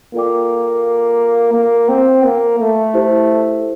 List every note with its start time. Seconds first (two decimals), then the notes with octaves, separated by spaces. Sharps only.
0.14 A#3 F4 A4 D5 G5 D6
1.54 A#3
1.89 C4
2.25 A#3
2.59 A3
2.94 E4 G4 C5